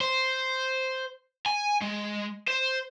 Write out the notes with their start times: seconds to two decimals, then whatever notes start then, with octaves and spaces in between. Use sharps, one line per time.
0.01 C5
1.46 G#5
1.82 G#3
2.47 C5